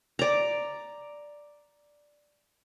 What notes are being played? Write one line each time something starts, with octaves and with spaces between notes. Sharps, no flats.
D5 A#5